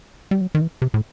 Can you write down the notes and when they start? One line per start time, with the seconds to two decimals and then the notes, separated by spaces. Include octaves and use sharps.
0.31 G3
0.41 F#3
0.55 D#3
0.61 E3
0.82 C3
0.94 A2